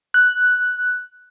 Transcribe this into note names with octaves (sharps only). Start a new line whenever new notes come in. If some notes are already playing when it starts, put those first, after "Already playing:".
F#6